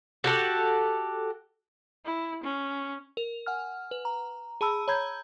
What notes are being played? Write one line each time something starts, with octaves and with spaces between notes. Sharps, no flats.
F#4 G4 A4 F#5
E4
C#4
A#4
F#5 G#5 F6
B4
A#5
G#4 A5 B5 E6
C#5 A#5 B5 G6 G#6